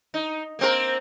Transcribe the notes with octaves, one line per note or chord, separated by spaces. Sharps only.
D#4
A#3 C4 A#4